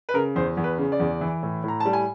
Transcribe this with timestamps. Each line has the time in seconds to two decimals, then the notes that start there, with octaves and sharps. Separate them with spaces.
0.09 B4
0.14 C#3 A#4
0.36 E2 C5
0.57 E2
0.64 B4
0.78 C#3
0.92 D5
1.00 E2
1.21 E3
1.43 A2
1.64 A2 A#5
1.80 A5
1.85 G3
1.93 G#5